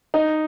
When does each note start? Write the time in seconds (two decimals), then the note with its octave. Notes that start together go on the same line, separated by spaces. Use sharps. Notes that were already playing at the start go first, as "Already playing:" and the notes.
0.14 D#4